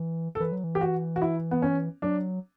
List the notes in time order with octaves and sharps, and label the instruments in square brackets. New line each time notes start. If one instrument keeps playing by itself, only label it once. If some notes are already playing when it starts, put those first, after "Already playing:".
Already playing: [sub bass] E3
[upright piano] A4
[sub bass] E3 [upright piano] B4
[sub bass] F#3
E3
[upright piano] G4
F#4
F#4
E4
B3
C#4
[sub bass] F#3 [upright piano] D4